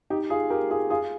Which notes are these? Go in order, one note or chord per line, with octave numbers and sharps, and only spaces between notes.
D#4 G4
F4 G#4
G4 A#4
F4 G#4
F4 G#4